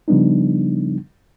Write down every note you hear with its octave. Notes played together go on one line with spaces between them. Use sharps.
C#3 F3 G3 B3 D4 D#4